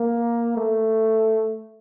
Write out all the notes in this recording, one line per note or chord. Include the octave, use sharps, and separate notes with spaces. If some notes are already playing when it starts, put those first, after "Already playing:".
Already playing: A#3
A3